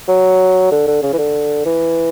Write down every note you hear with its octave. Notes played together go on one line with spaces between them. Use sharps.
F#3
D3
D3
C#3
E3
D3
E3